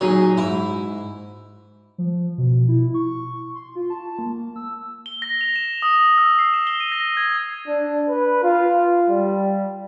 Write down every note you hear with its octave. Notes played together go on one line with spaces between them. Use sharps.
A#2 F#3 D#4 G#4
G#2 E4
F3
B2
E4
C#6
C6
F4
A5
A#3
E6
G7
A#6
F7
E7
D#6
E6
C7
E7
G7
D#7
A#6
G#6
D4
B4
F4
G3